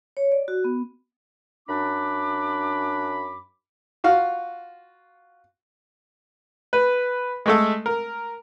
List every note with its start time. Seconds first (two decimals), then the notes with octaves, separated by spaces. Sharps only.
0.17 C#5
0.32 D5
0.48 F#4
0.64 B3
1.68 F#2 D4 B5 D6
4.04 F4 F#4 F5
6.73 B4
7.46 G#3 A3 A4
7.86 A#4